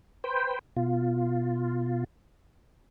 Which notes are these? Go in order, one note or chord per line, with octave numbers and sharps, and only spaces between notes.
B4 C5 G5
B2 F4